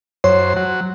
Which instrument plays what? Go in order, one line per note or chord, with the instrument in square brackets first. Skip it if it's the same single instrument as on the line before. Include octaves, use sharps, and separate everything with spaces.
[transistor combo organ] F#2 C5 [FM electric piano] C#5
[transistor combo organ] F#3